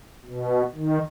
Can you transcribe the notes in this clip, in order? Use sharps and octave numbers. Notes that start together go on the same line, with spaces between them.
B2
D#3